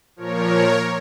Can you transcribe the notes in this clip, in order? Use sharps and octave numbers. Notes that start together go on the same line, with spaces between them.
A#2 F3 A#4 C#5